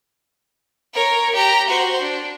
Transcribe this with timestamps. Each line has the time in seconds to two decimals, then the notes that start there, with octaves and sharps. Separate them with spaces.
0.94 A#4 C#5
1.34 G4 A#5
1.68 F#4 C5
2.01 D4